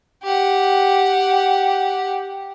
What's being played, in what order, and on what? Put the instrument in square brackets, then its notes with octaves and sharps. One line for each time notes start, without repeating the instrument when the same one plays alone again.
[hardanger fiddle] G4 F#5